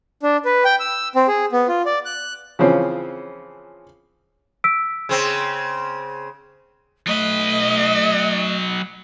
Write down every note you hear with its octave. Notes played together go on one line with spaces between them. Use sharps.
D4
B4
G5
E6
C4
G#4
B3
F4
D5
F#6
C#3 E3 F3 C4 C#4
E6 B6 D7
C#3 C4
F#3 A3 B4 D#5